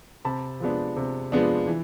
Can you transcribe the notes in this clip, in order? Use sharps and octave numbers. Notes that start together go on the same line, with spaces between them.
C3 A5 B5
F3 G#3 B3 D4
C3
F3 G#3 B3 D4
E3